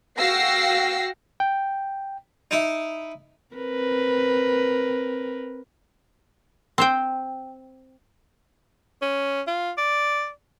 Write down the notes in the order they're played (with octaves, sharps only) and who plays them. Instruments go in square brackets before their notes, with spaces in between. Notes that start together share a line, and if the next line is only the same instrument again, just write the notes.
[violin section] F#4 F5 G5 E6 A#6 C7
[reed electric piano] G5
[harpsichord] D#4 E4
[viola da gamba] C4 A#4 B4
[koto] C4 C5 G5
[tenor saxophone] C#4
F4
D5